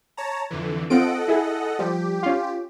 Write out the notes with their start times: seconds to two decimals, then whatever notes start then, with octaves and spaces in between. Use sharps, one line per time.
0.17 C#5 A5 A#5
0.51 F2 D3 E3
0.90 C4 F4 A4 D#5 F#5 D7
1.28 E4 G#4
1.79 F3 G3 G4
2.23 C#4 F4